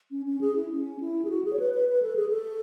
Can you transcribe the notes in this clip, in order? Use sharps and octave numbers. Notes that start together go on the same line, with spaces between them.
C#4
C#4
G#4
E4
C#4
E4
G#4
F#4
G#4
C#5
B4
B4
B4
A4
G#4
A4